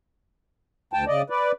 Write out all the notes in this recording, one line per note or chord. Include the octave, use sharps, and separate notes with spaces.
D2 G5 A5
C#3 D5 D#5
B4 D5